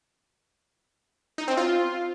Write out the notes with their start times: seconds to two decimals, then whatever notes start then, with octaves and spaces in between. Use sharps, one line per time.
1.38 D#4
1.48 C4
1.57 F4